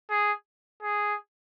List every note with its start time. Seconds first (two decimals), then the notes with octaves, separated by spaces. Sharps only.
0.10 G#4
0.83 G#4